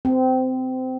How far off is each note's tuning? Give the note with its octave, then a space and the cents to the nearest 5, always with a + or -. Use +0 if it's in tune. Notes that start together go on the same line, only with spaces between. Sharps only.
C4 -20